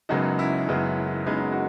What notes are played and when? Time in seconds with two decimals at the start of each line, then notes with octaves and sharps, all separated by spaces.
0.09 F#1 F#2 C#3 G#3 B3 D#4 F#4
0.38 C#4 E4
0.68 F#1 F#2 C#3 G#3 B3
1.26 F#1 F#2 C#3 G#3 B3 D#4
1.52 F#4